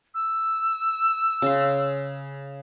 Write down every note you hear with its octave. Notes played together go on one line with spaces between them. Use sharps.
E6
C#3 C6